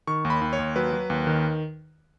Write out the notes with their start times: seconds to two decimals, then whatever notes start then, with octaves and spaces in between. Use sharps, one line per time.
0.07 D#3 C#6
0.25 D#2
0.30 B5
0.42 D#2
0.53 C#5
0.59 D#2
0.76 F#3 B4
0.93 F#3
1.10 D#2
1.27 D#3